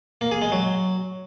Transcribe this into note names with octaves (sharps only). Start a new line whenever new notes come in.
A#3
G#4
G#3
F#3